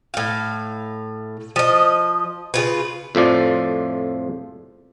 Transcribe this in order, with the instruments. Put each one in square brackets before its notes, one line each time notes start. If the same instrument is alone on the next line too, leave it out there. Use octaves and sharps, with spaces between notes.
[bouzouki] A2 F5
F3 D#5
C#3 F4 B4
[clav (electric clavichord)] F2 A2 F3 D5